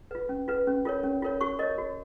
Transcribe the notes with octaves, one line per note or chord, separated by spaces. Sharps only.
F4 B4
C#4
F4 B4
C#4
F4 A#4 C#5
C#4
F4 A#4 C#5
F#4 C#6
A#4 C#5 D#5
F#4